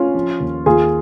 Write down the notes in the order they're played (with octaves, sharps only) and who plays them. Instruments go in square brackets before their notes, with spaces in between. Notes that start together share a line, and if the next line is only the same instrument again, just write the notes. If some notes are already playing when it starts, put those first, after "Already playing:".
Already playing: [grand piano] C#4 F4
F3
D#2
D#2 F4 G#4